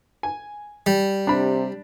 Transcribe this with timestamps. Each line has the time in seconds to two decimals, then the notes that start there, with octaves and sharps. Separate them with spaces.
0.23 G#5
0.86 G3
1.27 C3 D4 B5